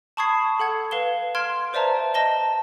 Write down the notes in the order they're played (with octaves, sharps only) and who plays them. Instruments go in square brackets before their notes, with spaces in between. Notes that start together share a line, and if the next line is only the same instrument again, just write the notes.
[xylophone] A5 B5 C#6 D#6 G#6 C7
A4 F#5 G#6
B4 F5 E7 G7
C6 F6 G#6 D7 E7
B4 C5 D5 E5 A5 A#5
D#5 A5 A#6 G7